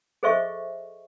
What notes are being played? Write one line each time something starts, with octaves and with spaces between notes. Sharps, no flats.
G#4 A4 C5 D#5 E5 C#6